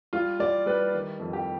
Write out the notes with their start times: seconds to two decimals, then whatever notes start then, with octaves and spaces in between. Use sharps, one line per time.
0.13 G3 F4
0.40 G3 D5
0.66 G3 B4
0.94 D#3
1.20 F2
1.33 G4